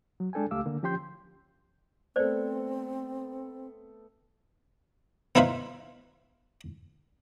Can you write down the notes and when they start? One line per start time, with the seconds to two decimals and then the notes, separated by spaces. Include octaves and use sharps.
0.20 F#3
0.33 G#3 D4 A4 G5 G#5
0.51 C#2 A3 G4 F5 D6 E6
0.66 D3 A#3
0.83 F3 C#4 G4 G5 C6 G6
2.16 A3 B3 C4 A4 C5 D5
5.35 B3 D#4 E4 B4 C5 F5